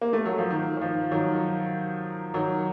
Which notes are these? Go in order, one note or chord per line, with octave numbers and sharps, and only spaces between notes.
A#3
A3
F#3
F3
D#3
D#3
F3
D#3 F#3
D#3 F#3